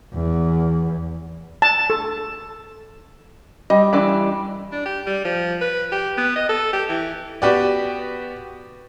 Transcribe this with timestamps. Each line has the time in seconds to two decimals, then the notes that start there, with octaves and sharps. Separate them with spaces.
0.14 E2
1.62 A5
1.90 A4
3.70 G3 D#5
3.93 E3 D4 B5
4.72 D4
4.86 G4
5.07 G3
5.25 F3
5.61 B4
5.92 G4
6.18 B3
6.36 D#5
6.49 A4
6.73 G4
6.89 E3
7.42 B3 F#4 G4 B4 D5